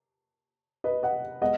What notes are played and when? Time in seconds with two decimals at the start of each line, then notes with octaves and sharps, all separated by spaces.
0.84 B4 D#5
1.03 D#5 F#5
1.42 G#3 B3 D#5 F#5